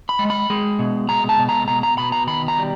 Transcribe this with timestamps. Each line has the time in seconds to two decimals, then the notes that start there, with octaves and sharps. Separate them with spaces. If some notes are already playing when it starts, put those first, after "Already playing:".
0.09 B5
0.19 G#3
0.30 B5
0.50 G#3
0.79 B2
1.09 G#3 A#5
1.29 A5
1.39 B2
1.49 A#5
1.68 B2 A#5
1.83 A#5
1.98 B2 B5
2.12 A#5
2.27 D#3 B5
2.48 A#5
2.58 G3